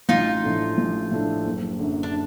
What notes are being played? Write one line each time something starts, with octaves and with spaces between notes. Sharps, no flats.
A1 D#4 F4
A2 F3 A3 D4
A1
A2 F3 A3 D4
F#1
F#2 D3
D4